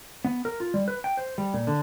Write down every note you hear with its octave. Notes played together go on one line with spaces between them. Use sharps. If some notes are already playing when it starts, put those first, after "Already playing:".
B3
A#4
F4
G3
B4
G5
C5
G3
A#2
D3